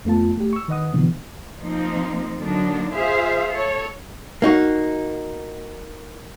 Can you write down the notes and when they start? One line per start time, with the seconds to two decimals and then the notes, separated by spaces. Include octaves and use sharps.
0.05 F2 A3 B3 F4 A5
0.37 A3 G4
0.53 C#6 E6
0.68 D#3 B4 D#5 F#5 D#6
0.93 B2 D3 E3 F3 B3
1.60 F3 A#3 C4 D#4
2.38 D3 F#3 A#3 D4 D#4
2.94 F4 G#4 C5 E5 F5
3.51 A4 C#5
4.42 A#3 D#4 F#4